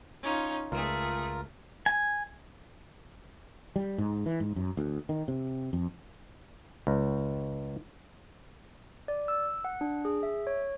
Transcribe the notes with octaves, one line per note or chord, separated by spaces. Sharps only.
C#4 D#4 F4
C#2 A3 F4 G#4 A#4
G#5
G3
G#2
E3
G#2
F#2
D2
D#3
C3
F2
C#2
D5
E6
F#5
D4
G#4
E5
C#5